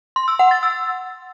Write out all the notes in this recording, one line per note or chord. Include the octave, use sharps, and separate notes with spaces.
C6
E6
F#5
A6
E6